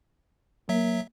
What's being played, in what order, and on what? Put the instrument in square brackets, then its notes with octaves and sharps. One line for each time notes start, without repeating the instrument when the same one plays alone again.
[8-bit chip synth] F#3 E5 [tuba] A#3